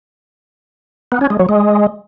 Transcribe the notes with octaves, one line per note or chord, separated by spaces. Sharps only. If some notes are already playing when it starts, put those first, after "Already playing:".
B3
C#4
G#3
F#3
G#3